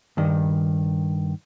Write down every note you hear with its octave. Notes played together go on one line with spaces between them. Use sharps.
G2 D#3